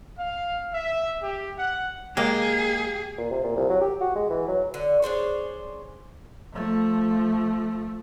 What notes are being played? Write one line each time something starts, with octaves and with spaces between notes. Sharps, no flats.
F5
E5
G4
F#5
G#3 A#3 G4 G#4
A#2
C3
A#2
C2
F#3
G4
F#4
G#3
E3
F#3
D3
D4 G#4 C5 C#5
F3 A3